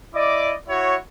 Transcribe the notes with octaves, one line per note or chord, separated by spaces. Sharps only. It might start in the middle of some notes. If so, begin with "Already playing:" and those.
E4 D5 D#5 D6
E4 F#4 C#5